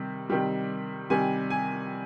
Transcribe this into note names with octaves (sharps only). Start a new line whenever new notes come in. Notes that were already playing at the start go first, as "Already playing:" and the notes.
Already playing: C3 D#3 G3
C3 D#3 G3
C3 D#3 G3 G#5
G#5